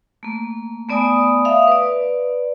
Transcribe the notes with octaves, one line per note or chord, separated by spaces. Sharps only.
A3 A#3
A3 B3 D5 G#5 D#6
E5 F5 D#6
B4 D5